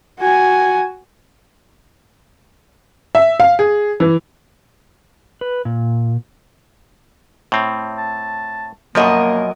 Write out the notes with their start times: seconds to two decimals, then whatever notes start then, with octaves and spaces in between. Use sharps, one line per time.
0.20 F#4 G#5
3.15 E5
3.40 F5
3.59 G#4
4.00 E3
5.41 B4
5.65 A#2
7.52 A2 C4
7.98 A5
8.95 F#2 B2 F3 F#3 A#3 A#4 D#5